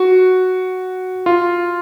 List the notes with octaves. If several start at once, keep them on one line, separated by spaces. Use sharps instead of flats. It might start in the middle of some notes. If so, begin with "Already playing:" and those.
Already playing: F#4
F4